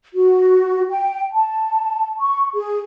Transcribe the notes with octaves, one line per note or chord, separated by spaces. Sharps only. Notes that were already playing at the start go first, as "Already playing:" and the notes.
F#4
G5
A5
C#6
G#4